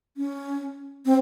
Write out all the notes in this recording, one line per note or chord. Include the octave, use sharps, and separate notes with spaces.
C#4
C4